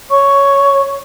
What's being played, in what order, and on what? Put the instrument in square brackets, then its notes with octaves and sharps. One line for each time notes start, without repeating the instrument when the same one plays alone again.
[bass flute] C#5 [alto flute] C#6